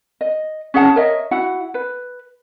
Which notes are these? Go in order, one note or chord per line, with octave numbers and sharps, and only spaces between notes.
D#5
C#4 G#4 F#5 A5
A#4 C#5 D#5 E5
E4 F#4 F#5
B4